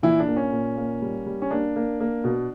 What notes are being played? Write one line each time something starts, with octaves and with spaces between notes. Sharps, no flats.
A#2 E3 E4
D4
A#3
C#4
A#2
A#3
G3
G3
C#4
A#3 D4
A#3
A#3
B2